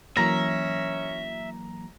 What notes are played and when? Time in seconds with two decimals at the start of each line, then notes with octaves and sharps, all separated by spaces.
0.17 E3 F#3 A#3 C#4 E5 A#5 A#6